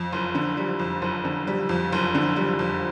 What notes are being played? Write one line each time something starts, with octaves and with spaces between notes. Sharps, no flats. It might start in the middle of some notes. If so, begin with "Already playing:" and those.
Already playing: F2
F#1
D3
G3
F2
F#1
D3
G3
F2
F#1
D3
G3
F2